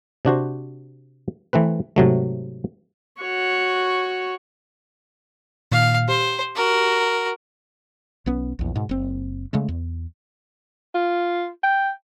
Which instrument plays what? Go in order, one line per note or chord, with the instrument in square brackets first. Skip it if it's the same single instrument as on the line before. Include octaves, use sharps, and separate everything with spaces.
[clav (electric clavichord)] C3 D4 F#4 C5
E3 A3 C4 B4
G#2 C3 F#3 A3
[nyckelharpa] F#4 C#5
[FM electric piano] A#2 D#3 [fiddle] F5
[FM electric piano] G4 [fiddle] C5
[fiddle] F#4 A#4
[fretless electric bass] B1 B3 C#4
A#1 E2
G#2 B2
F#1 C4
C#3 G#3 A3
E2
[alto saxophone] F4
G5